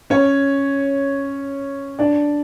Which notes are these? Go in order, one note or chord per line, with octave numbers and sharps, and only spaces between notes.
C#4 C#5
D4 D5